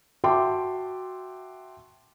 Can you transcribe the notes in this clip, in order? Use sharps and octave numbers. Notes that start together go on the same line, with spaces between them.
F#4 E5 G5 A5 C6 D6